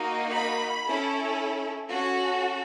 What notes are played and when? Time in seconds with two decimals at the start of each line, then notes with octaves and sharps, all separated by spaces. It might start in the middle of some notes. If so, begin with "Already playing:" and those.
Already playing: A#3 D#4 F#4
0.35 B5
0.85 C#4 E4 A4
1.87 C#4 F#4 A4